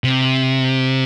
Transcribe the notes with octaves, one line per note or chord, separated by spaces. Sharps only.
C3